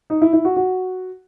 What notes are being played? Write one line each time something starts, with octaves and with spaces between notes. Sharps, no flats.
D#4
E4
E4
F#4
F#4